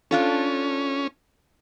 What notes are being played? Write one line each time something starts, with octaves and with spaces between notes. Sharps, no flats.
C#4 D4 F4 A4